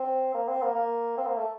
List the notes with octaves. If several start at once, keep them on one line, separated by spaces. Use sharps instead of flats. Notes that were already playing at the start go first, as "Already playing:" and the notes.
Already playing: C4
A#3
C4
A#3
A#3
C4
A#3
A3